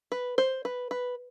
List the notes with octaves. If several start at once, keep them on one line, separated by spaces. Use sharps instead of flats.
B4
C5
B4
B4